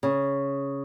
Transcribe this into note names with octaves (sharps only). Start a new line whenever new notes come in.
C#3